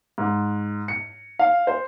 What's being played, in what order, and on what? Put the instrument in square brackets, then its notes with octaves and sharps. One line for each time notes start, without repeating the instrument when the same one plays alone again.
[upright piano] G#2
C#7
F5
C5